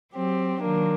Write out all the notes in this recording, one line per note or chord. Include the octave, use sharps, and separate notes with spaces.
F#3 C4 G4
D#3 F#3 A#3 D4